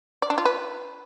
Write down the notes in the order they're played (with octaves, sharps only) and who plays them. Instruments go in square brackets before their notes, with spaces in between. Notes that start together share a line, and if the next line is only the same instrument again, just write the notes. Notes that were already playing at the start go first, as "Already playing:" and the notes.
[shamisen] D5
D4
F4
B4